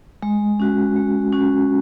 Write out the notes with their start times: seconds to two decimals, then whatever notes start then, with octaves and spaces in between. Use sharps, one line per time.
0.22 G#3
0.60 C#4 F#4
0.96 G#3
1.32 C#4 F#4